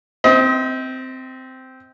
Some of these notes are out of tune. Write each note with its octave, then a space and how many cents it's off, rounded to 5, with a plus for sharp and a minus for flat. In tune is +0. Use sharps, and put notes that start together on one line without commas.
C4 -10 D#5 +40